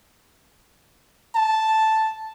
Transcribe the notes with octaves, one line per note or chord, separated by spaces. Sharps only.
A5